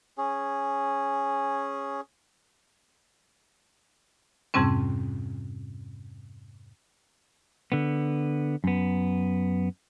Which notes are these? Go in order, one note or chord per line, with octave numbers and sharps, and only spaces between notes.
C#4 G#4
F2 G#2 C3 G3 C4 C#4
D3 B3
F#2 B3